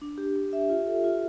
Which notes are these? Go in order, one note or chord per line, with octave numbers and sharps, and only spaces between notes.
D4
G4
G4
E5
F4
A4
F4